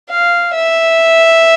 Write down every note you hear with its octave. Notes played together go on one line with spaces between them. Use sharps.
F5
E5